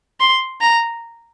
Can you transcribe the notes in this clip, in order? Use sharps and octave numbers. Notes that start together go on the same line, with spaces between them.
C6
A#5